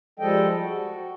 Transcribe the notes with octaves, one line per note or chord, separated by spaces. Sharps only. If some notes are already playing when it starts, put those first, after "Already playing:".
F3 G3 G#3 A4 D#5 G5
F#4